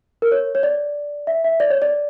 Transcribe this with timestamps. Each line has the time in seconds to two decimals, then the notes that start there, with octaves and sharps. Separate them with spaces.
0.22 A#4
0.32 C#5
0.55 C#5
0.63 D5
1.27 E5
1.44 E5
1.60 D5
1.70 C#5
1.82 D5